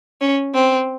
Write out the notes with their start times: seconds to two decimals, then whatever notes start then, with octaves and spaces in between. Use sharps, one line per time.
0.21 C#4
0.54 C4